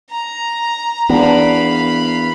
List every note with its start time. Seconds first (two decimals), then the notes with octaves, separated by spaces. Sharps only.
0.10 A#5
1.09 E2 A#3 B3 D4 F5 B5